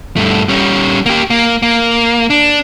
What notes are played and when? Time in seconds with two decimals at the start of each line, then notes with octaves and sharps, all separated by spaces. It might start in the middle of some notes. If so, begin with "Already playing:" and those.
0.16 G2 A3
0.48 G3 C#4
1.06 A#3 G4
1.30 A#3
1.63 A#3
2.30 D4